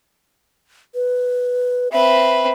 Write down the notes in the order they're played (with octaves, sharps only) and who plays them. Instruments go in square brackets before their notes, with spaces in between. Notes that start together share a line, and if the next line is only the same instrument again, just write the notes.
[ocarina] B4
[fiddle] C4 B4 [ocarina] E5